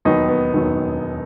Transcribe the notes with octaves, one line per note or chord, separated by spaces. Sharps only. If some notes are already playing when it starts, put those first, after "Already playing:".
E1 D#2 D#3 F#3 B3 D#4
B3
E1 D#2 D#3 F#3